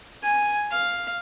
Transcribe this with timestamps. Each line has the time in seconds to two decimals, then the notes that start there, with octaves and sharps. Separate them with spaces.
0.23 G#5
0.71 F5